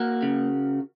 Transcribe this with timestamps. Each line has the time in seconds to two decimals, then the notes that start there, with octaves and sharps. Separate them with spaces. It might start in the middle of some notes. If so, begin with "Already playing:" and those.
Already playing: A#3 F#4 A#4
0.23 C#3